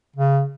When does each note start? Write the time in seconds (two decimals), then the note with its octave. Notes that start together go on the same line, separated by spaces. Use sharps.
0.16 C#3